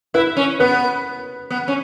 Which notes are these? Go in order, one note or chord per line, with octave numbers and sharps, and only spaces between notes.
E4 B4
C#4
B3 B4
B3
C#4